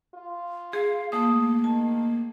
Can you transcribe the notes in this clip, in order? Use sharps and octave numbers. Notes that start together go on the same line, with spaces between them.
F4
G#4 F5
A3 A#3 D#6
D#3 A5